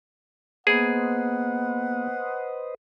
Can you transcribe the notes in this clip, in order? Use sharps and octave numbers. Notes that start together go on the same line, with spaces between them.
A#3 B3 G#4 B4 C5 D#5 F#5